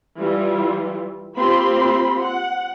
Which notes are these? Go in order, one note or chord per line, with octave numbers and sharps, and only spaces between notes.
E3 G3 F4
A#3 C4 F4 G4 B5 C6
F#5